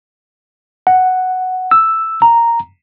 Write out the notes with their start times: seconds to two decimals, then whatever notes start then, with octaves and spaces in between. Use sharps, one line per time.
0.87 F#5
1.71 E6
2.22 A#5